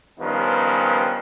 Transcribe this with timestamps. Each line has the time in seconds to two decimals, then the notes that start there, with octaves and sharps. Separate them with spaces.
0.20 G2 D#3 F3 B3 C#4